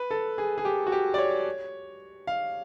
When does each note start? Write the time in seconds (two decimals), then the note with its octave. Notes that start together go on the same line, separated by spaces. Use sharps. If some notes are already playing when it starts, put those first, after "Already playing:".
Already playing: B4
0.11 A4
0.38 G#4
0.58 G#4
0.65 G4
0.87 F#4
0.92 G4
1.14 D5
1.18 C#5
2.27 F5